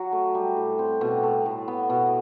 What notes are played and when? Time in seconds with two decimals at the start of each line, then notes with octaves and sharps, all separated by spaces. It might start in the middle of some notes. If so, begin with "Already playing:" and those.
Already playing: F#3 F#4
0.12 A3
0.34 G3
0.57 A2
0.79 C4
1.01 B2
1.23 A3
1.46 A2
1.68 B3
1.90 B2